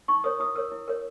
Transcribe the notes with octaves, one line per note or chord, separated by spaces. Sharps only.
D#4 C#6
A#4 C#5 D#6
E4 D#6
A#4 C#5 E6
E4
A#4 C#5